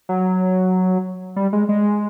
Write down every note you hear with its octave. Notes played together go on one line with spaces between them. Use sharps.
F#3
G3
G#3
G#3